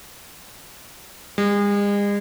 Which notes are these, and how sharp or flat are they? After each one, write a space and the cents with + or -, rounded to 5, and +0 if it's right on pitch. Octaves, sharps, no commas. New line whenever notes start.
G#3 -40